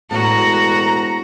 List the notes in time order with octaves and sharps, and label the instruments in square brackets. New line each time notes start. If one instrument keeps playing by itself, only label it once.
[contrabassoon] E1 [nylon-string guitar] A2 [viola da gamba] F#4 [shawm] A#5